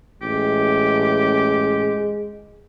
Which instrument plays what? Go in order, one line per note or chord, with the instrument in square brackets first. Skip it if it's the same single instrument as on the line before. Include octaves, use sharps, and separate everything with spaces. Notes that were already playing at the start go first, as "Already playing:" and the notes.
[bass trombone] A1 [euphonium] G#3 [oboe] G4